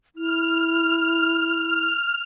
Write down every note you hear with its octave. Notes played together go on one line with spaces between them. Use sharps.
E4 F6